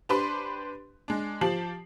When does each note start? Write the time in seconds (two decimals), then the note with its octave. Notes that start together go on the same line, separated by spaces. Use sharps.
0.09 D4 G4 B4 C5 B5 C6
1.08 G#3 D4
1.41 F3 G4 A5 C7 F#7